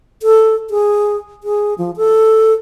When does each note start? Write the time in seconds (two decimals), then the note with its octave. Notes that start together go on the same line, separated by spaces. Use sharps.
0.23 A4
0.70 G#4
1.44 G#4
1.78 F3
1.97 A4